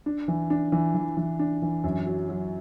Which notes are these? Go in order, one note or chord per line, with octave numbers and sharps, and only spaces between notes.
D4
E3
D4
E3
E3
E3
D4
E3
F#2
F#3
F#3